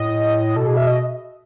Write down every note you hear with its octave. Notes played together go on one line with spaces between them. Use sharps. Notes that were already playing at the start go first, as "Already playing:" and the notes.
Already playing: A2 D#5
B2 A4
G#4
E5
D#5